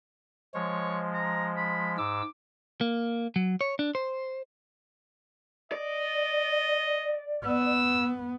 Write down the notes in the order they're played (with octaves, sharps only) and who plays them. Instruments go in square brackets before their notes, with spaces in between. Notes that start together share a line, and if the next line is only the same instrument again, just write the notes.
[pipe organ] F3 G#3 [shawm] C#5
[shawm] A#5
B5
[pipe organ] G#2 E6 [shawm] D6
[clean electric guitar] A#3
F#3
C#5
D4
C5
[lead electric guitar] D5 [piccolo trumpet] D#5
[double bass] B3 [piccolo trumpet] E6